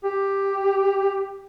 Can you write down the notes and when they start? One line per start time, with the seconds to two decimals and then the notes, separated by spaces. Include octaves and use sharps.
0.04 G4